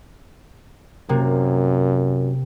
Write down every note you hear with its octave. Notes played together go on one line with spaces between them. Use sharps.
F#2 C3 A#3